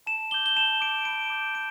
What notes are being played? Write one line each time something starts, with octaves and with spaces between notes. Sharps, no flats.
A5 E7
D6 G6 G7
G7
A5 E7
D6 G6 D7
B5 D7
D6 G6
D7